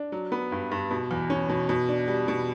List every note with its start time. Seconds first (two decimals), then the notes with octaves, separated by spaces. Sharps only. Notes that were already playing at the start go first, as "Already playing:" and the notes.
Already playing: D4
0.12 F#3
0.32 B3
0.52 G2
0.71 G2
0.91 B2
1.11 E2
1.30 C#4
1.49 B2
1.69 B2
1.89 D4
2.08 G3
2.28 B2